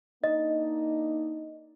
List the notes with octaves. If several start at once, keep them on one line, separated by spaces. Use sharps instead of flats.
A#3 D4 D#4 D#5